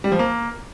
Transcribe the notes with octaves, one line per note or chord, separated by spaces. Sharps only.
G3
F3
A#3